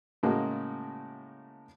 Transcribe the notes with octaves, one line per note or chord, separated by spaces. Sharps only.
A2 C#3 G#3 A#3 F#4